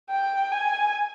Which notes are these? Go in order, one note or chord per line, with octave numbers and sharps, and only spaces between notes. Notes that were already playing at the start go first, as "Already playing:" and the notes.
G5
G#5